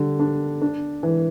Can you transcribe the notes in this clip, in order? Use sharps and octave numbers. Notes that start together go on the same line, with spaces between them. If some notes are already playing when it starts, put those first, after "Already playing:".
Already playing: D3 G3
D4
D4
E3